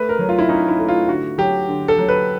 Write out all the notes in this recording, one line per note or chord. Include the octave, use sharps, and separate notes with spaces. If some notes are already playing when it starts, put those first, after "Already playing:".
Already playing: A3 B4
A#4
F#3
F4
E4
C#4 D#4
E4
A3
F4
D3 F#4
F#3 G4
D3
A4
F#3
B4